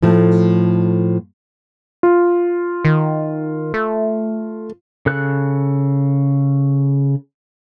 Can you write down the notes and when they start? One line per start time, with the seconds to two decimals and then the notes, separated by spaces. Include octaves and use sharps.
0.02 A2 F3 A3
2.03 F4
2.85 D#3
3.74 A3
5.06 C#3 A4 F#6